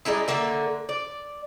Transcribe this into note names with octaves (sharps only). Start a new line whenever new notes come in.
G3 G#3 D#4 E4
D3 A3 A#3 E5
D5